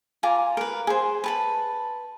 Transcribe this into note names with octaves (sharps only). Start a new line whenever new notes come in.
F4 G#5 A#5 D6
A#4 B4
G#4 C5
B4 A5 B5